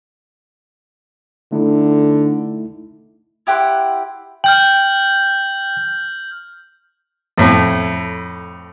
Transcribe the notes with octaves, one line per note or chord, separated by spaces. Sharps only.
D3 A3 D#4 E4
E4 G4 F#5 C6
G5 F6 G6 F#7
F2 A2 A3